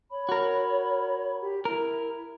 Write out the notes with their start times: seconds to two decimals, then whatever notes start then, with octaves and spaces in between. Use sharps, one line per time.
0.10 C#5 B5
0.29 F#4 A#4
1.41 G4
1.65 E4 A#4